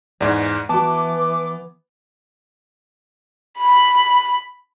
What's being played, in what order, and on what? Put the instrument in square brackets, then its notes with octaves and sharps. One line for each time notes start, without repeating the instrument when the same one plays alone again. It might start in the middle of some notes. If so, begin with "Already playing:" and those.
[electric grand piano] E2 G#2 G#6 [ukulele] D5 F#5
[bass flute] E3 [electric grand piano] B3 [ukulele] F#4 A5 [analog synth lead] D6
[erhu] B5